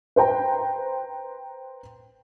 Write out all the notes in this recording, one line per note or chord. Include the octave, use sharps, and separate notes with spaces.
B4 C5 G5 A#5